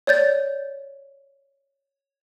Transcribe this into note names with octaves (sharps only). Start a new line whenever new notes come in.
C#5 D5 G6 A6